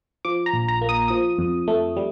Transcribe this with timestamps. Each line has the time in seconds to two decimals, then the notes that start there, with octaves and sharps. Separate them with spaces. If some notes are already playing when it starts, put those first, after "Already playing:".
0.25 F3 D6
0.46 A#5
0.53 A#1
0.68 A#5
0.82 A#3
0.89 D#6
1.08 F3 D#6
1.38 F2
1.68 A3
1.97 G3